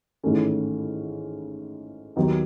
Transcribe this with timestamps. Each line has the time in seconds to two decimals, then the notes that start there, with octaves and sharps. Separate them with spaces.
0.23 A1 G#2 D#3 A3 C#4
2.16 D#2 D#3 F#3 B3 D#4